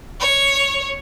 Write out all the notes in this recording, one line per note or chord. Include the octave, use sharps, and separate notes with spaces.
C#5